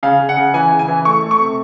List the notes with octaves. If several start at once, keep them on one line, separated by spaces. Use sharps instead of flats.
C#3 F5
C#3
F#5
C#3
E3 G#5
C#3
G#5
E3
A3 C#6
A3
C#6
C3